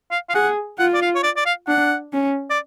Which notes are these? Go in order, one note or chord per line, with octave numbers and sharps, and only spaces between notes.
F5
F5
G#4 F#5
F4 F#5
D5
F5
C#5
D5
D5
F5
D4 F#5
C#4
D5